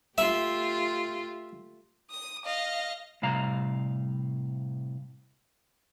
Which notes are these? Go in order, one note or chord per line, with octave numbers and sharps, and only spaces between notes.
A3 F4 G4 E5
D#6 D#7
D#5 F5
A2 C3 G3 F5 A#5